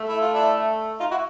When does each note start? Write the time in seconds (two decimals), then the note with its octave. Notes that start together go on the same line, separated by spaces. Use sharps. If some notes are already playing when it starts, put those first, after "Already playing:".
Already playing: A3
0.09 E4
0.21 F4
0.33 D4 E4
1.00 D#4 F4
1.11 E4 F#4